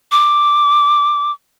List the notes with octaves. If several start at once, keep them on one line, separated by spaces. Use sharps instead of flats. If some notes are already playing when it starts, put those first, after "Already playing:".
D6